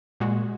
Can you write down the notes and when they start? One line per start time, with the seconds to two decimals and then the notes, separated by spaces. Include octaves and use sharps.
0.20 A#2 G#3 F#4